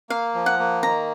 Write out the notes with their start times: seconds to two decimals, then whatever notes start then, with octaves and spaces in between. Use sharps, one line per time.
0.10 A#3 F5
0.34 F3
0.46 F#5
0.59 A#3
0.83 D#3 A#5